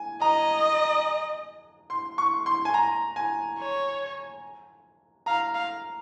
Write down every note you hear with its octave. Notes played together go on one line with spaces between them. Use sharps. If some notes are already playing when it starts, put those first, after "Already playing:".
Already playing: G#5
D#5 A#5
C6
C#6
C6
G#5
A#5
G#5
C#5
F5 A#5
F5